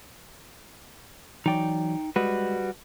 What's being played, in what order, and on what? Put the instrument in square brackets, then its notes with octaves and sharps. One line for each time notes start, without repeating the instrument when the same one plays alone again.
[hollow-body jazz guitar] E3 F#3 D5 [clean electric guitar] D#4 G5
[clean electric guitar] G3 F#4 B4 [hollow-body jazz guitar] G#3